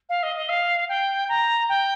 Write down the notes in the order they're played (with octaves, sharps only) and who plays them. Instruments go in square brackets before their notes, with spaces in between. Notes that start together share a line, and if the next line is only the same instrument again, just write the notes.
[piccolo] F5
D#5
D#5
F5
G5
A#5
G5